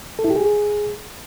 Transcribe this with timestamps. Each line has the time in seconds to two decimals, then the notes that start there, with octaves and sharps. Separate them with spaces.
0.19 A4
0.24 E4
0.30 G4
0.36 G#4